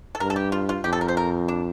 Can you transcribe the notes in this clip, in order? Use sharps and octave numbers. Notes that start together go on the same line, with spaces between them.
A4
G2 A#4
A4
G4
F4
F4
F2 G4
A4
A#4
C5
A#4
D4